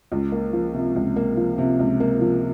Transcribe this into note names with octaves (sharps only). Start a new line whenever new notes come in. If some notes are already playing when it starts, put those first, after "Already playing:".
C#2
A#3
F3
C3
C#2
A#3
F3
C3
C#2
A#3
F3